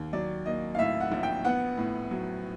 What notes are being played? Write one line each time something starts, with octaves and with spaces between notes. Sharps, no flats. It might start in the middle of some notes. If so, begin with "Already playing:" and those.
Already playing: D#2
F#3 D5
A#3 D#5
F5
A2 E5
F#5
A#1
G5
B3 F#5
A2
F#3